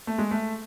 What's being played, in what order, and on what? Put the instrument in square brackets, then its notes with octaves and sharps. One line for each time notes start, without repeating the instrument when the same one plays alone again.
[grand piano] A3
G#3
A3